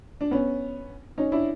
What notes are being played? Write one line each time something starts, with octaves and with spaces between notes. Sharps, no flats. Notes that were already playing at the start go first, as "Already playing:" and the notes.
D4
B3 C#4
C#4 D#4
D4 E4